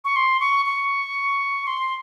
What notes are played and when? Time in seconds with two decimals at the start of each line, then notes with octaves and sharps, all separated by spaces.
0.05 C#6
0.16 C6
0.40 C#6
0.66 C#6
1.67 C6